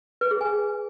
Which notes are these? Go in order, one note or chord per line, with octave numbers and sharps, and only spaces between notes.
B4
G#4
G#5